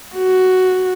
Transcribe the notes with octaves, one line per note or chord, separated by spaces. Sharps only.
F#4